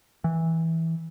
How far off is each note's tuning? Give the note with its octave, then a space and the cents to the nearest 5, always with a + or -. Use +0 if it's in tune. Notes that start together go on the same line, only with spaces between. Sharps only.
E3 -15